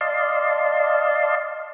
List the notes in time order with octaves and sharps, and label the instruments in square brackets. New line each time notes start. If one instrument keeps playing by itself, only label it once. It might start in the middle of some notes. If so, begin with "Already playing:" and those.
[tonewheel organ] D5 D#5 F5 A5 C6